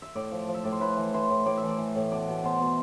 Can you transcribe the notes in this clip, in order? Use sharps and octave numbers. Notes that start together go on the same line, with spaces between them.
E5
A2 D5
F3
F3
E5
A2 D5
C5
A2 B4
E3
E3 C5
A2
A2 D5
E5
E3 D5
E3
A2
B2 D5
B2
B2 C5
B2